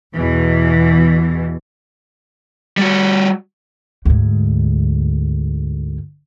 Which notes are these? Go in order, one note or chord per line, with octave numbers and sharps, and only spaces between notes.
E2 B2 E3
G3 F#4
D2 G#2